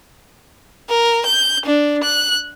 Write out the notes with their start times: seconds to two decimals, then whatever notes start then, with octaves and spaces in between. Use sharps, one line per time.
0.89 A#4
1.26 G6
1.66 D4
2.04 F#6